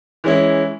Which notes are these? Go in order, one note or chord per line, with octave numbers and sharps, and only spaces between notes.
E3 G#3 C#4 E4